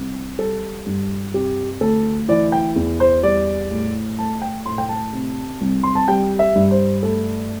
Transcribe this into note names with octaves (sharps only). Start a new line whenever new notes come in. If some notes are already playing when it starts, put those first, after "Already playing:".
Already playing: C2
G3 A4
G2
C3 G4
D2 A4
E3 D5
G5
E2
C5
G3 D5
A2
A3 A5
G5
A2 C6
G5
A5
C3
C2
C6
A5
G3 G5
E5
G2
C5
A3 A4